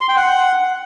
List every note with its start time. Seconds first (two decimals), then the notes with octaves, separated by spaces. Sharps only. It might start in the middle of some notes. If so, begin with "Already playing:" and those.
0.01 C6
0.09 G5
0.16 F#5